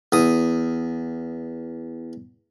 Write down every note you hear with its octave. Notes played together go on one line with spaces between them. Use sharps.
E2 D#6